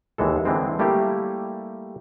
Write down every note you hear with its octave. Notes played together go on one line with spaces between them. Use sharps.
D#2 E3 G#3 A4
D3 E3 G#3 C4
G3 A3 A#3 E4 G4